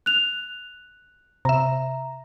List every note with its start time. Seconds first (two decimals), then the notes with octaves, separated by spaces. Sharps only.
0.06 F#6 F7
1.45 C3 E5 A#5